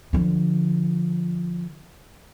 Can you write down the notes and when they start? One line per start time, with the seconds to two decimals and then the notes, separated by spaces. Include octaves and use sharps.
0.13 D3 F3